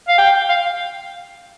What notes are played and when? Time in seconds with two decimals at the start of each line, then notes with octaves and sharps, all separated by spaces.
0.08 F5
0.18 G5
0.49 F5